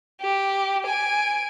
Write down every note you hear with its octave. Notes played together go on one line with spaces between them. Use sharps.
G4
G#5 D7